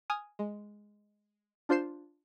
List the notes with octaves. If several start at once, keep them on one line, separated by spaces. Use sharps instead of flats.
G#5 D#6 F6
G#3
D4 F4 C5 G6 C7 E7